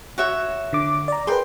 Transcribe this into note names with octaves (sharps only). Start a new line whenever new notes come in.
F#4 C#5 E5
D3 D6
D5 A#5
G#4 A#4 B4 G5 C6